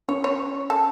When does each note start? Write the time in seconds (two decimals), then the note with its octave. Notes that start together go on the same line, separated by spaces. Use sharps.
0.08 C#4 C#5
0.24 C#5
0.70 A4